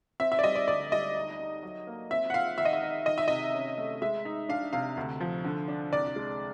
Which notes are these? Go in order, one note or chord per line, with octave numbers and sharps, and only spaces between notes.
C4 E5
E5
D5
G3 D#5
D5
D2 D5
G3 D#5
D#4
D#4
F#3
A#3
C4 E5
F#5
F4 F5
D#3 E5
D#5
E5
D#4
D#3 D#5
E5
C3 D#5
C#4
A3
G#3 E5
D#4
D4 F5
C3 F5
D2
F3
D3
D4
C2 D5
G#3